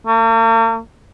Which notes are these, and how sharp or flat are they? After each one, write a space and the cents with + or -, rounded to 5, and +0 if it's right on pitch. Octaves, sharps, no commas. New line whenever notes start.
A#3 -45